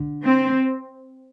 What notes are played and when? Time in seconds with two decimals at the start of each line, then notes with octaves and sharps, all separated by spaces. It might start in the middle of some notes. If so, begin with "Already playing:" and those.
Already playing: D3
0.23 C4